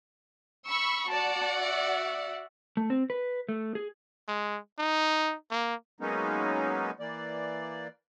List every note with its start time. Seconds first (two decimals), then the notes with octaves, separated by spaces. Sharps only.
0.68 B5 C#6 E6
1.09 F#4 D5 F#5 A5
1.59 E5
2.77 A3
2.90 C4
3.10 B4
3.49 A3
3.75 G#4
4.28 G#3
4.79 D#4
5.51 A#3
6.00 F#3 G#3 A#3 B3 C#4 D#4
7.00 E3 A#3 D5